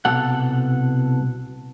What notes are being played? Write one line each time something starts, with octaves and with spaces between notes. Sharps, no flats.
C2 B2 A4 F#5